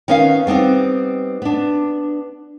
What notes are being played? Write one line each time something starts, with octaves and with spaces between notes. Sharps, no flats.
D#3 B3 C#4 D#4 E5 F5
G3 B3 C4 D#4
B3 D4